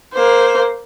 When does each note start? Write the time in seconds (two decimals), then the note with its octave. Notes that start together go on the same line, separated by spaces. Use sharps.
0.13 A#3 C5